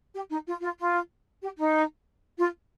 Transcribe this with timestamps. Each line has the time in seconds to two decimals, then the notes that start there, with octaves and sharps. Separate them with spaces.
0.14 G4
0.30 D#4
0.47 F4
0.62 F4
0.78 F4
1.42 G4
1.57 D#4
2.38 F4